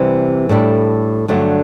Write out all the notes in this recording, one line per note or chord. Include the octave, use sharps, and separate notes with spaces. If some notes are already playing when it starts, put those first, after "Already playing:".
Already playing: C3 E3 G3
A2 G3 D4 A4
G2 D3 F#3 A3 D4